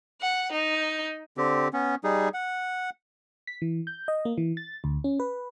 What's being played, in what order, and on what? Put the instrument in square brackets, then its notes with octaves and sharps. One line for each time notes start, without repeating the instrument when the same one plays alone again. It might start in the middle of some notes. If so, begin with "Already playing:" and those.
[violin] F#5
D#4
[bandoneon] D3 C4 G4
B3 C#4
G3 D#4 G#4
F#5
[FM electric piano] B6
E3
G6
D#5
A#3
E3
A6
D2
C#4
B4